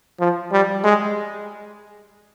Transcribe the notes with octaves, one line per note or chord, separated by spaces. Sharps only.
F3
G3
G#3